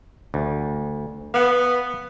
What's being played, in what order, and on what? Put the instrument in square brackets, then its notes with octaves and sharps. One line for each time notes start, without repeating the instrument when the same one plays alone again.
[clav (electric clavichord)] D2
[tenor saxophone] B3 [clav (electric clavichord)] F5 F#5